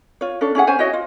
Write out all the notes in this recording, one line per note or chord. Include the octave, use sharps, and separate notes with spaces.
F4 C#5
C#4 D4 A4
C#4 E4 G#4 F#5
C#4 C5 G#5
E4 F#4 C#5 D#5
F4